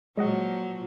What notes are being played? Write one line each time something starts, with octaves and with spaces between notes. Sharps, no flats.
A#2 F3 F#3 G#3 D#5 F#5